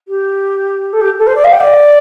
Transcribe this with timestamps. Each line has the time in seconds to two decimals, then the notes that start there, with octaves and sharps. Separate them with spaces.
0.08 G4
0.93 A4
1.01 G4
1.19 A4
1.27 C5
1.35 D5
1.44 F5
1.52 G5
1.60 D5